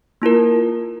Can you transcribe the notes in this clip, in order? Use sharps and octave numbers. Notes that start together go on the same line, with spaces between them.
A#3 E4 F4 A#4